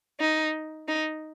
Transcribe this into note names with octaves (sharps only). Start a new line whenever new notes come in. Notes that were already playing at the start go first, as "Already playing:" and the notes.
D#4
D#4